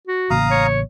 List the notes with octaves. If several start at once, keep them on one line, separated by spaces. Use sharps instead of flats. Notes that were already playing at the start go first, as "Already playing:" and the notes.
F#4
A1 C#3 A#3 F5 A#5 D#6
C#5